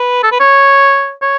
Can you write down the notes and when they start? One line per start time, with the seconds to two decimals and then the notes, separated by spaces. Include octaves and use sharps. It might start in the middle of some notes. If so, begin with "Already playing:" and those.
Already playing: B4
0.23 A4
0.32 B4
0.40 C#5
1.22 C#5